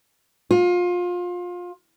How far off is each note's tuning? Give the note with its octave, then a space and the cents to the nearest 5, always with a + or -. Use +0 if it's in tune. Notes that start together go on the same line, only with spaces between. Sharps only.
F4 +25